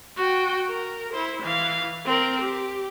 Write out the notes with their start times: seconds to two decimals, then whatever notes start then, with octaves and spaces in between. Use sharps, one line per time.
0.17 F#4 G5
0.68 A#4
1.13 E4 C5
1.43 E3 F5
2.05 C4 A#4
2.41 G4